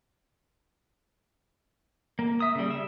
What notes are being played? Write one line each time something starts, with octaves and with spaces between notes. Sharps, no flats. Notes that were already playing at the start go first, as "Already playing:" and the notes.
A#3
E5 D#6
C#3 G3
E5